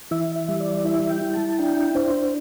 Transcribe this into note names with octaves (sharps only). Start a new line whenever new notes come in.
E3 E5
E5
G3
D5
E4 E5
G5
E4
A5
D4 G5
D4 C5